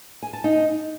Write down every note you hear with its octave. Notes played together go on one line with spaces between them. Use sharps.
G#5
A5
D#4